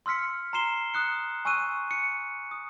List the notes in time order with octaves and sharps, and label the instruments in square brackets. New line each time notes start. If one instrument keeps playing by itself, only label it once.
[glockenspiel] C6 E6 F6 B6 C#7
A#5 C6 C7 E7 G7
D#6 F#6 C#7
G#5 C#6 E6 F#6 D#7
C#7
D#6